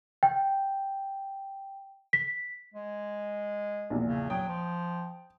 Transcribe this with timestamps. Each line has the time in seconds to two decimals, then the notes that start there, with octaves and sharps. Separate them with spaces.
0.23 G5
2.13 B6
2.74 G#3
3.90 A#1 E2 A#2
4.05 C#3
4.30 F#3 G5 D#6
4.48 F3